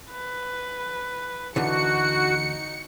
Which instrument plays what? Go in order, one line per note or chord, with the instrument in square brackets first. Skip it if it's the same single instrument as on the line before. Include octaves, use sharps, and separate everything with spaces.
[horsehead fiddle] B4
[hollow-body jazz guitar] D2 D3 E3 [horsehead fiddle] D#4 [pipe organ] F#4 [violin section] C#7